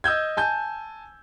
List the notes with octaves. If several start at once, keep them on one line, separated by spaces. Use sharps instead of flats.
D#5 E6 G6 G#6
G#5 A5 G6